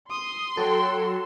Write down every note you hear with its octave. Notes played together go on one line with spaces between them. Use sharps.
C6 D#6
F#3 A4 G5